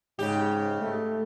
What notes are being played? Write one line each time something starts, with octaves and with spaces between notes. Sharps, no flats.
G#2 C#3 G4
A3